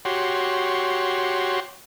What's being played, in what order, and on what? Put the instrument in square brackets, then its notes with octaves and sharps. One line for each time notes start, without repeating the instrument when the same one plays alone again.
[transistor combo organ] F#4 G4 C#5 C6